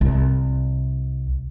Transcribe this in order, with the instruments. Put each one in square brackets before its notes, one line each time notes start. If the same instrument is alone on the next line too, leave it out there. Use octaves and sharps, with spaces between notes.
[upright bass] C2